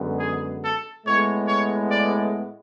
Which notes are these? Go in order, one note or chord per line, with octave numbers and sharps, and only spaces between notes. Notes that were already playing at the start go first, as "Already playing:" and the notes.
Already playing: F#2 D3 G#3 B3
G#4
A4
A2 G#3 B3 C#5
C#5
D5